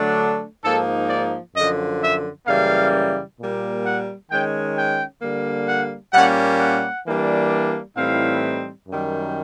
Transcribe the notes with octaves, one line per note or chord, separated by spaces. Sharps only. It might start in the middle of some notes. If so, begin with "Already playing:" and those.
Already playing: D3 F#3 A3 D4
G#2 F3 A#3 D#4 A4
D5
F#2 D3 F3 D#5
E5
F#2 C#3 E3 G3 A#3 F5
A#2 G3 A#3
F#5
D#3 G#3 C#4 G5
G5
D3 G3 A#3
F#5
A#2 G3 A#3 C#4 F#5
F#5
E3 G3 A#3 D4
A2 E3 G3 C4 D#4 F5
F#2 D#3 G3